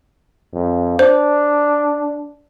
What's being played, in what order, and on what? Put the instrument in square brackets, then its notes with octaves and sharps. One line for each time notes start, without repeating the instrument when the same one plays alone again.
[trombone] F2
[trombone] D4 [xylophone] C5